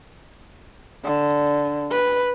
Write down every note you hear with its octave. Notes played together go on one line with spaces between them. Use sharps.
D3
B4